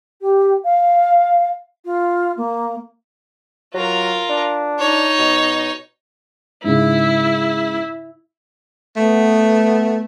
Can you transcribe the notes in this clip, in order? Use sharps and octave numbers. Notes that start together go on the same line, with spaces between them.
G4
F5
F4
A#3
F#3 F4 A#4
D4
D#4 C#5
B2
G#2 C#3 E4
A3 B3